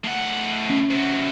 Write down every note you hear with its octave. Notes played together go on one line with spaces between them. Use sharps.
A2 F#5
C#4
C3 F#4